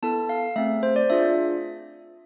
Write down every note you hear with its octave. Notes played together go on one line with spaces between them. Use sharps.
B3 E4 A4 A5
F5
A3 C4 G#4 E5
C5
D5
D4 F4 G#4 E5